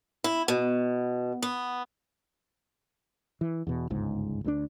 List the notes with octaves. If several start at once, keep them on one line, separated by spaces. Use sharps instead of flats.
E4
B2
B3
E3
E2 B2
G1 C#2 G#2
D2 E3 D4